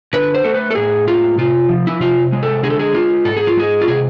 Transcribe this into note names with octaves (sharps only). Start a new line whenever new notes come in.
D3 B4
C5
A3 A4
B4
A4
A2 G#4
G#3 F4
C3 F4
F3
E4
C3 F4
G#3
A4
D3 G#4
A4
G#4
G#3 F4
G#2 A4
G#4
F4
G#3 G#4
F4
C3 G#4